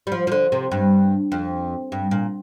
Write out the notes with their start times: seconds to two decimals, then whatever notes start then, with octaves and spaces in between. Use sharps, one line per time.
0.07 G3
0.12 F3
0.27 F3
0.32 D3
0.52 C3
0.72 G2
1.32 F2
1.92 G2
2.11 A#2